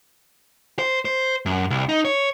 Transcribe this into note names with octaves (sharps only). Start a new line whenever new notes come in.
C5
C5
F#2
C2
D#4
C#5